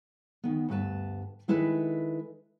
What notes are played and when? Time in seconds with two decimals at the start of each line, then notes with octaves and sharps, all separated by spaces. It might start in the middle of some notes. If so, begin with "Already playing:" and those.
0.44 D2 D#3 B3
0.69 D2 G2 B4 A5
1.48 D#3 G#3 E4 A4 B4